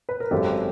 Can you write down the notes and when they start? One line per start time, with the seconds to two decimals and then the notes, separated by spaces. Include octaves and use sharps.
0.09 B4
0.20 A#4
0.31 G#1 F#2 D#3 G4 A4